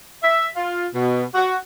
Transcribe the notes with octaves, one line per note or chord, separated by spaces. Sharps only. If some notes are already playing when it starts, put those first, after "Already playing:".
E5
F4
B2
F#4